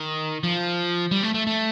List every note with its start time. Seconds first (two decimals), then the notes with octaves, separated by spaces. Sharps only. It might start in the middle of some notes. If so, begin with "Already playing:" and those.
Already playing: D#3
0.44 F3
1.11 G3
1.23 A3
1.34 A3
1.47 A3